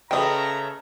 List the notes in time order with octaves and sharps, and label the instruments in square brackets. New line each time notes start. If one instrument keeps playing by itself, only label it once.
[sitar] C#3 A3 [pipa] B4 D#5 [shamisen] G5 [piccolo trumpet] A#5